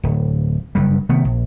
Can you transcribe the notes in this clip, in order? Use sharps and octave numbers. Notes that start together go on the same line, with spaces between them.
D1
F#1 G2 G3
C3 D#3 A3 B3
A#1